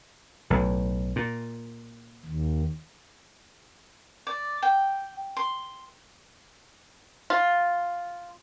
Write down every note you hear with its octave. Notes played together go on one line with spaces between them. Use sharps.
B1 A2
A#2
D#2
D5
G5
C6
F4